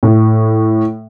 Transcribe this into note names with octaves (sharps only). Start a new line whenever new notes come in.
A2